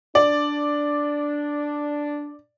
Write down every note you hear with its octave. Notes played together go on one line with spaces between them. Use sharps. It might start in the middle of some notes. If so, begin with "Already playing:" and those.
D4 D5